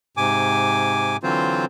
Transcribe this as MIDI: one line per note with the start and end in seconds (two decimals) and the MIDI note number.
0.17 1.17 44
0.17 1.17 48
0.17 1.17 80
0.17 1.17 86
1.23 1.65 50
1.23 1.65 52
1.23 1.65 54
1.23 1.65 60
1.23 1.65 65
1.23 1.65 72